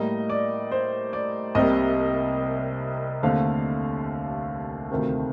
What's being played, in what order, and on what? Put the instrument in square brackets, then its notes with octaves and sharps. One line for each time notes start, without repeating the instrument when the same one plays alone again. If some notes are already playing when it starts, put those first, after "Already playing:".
Already playing: [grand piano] A2 G3 A#3 D#5
D5
C5
D5
C2 C3 G3 A#3 D#5
D#2 D3 A3 C4 F5
D2 C3 D#3 A3 C4